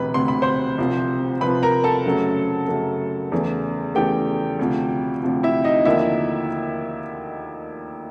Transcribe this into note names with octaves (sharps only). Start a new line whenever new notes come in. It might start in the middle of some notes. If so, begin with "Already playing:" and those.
Already playing: E1 D2 C3 B4 B5
E1 D2 C3 C6
B5
C5 C6
C2 C3 F3
C2 C3 F3 B4 B5
A#4 A#5
A4 A5
F#2 C#3 F#3 A3
F#2 C#3 F#3 A3
E2 C#3 E3 A3
E2 C#3 E3 A3 G4 G5
D2 C3 F3
D2 C3 F3
E4 E5
D#4 D#5
D#2 D3 F3 A#3 E4 E5